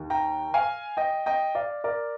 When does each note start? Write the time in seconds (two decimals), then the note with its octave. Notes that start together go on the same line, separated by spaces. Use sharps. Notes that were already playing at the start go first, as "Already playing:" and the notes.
Already playing: D#2 D#3
0.10 G5 A#5
0.54 F5 G#5
0.97 D#5 G5
1.26 D#5 G5
1.55 D5 F5
1.84 A#4 D5